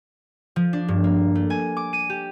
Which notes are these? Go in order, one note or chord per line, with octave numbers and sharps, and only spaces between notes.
F3
D4
G2
A#3
A3
G#5
D6
D#7
G4